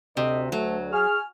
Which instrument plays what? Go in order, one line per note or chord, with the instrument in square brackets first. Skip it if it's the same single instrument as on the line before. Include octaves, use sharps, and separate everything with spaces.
[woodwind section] D2 [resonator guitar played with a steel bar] C3 [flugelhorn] D#5
[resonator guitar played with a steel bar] F#3 [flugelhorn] A3
[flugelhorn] G#4 [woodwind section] G#5 C#6 F6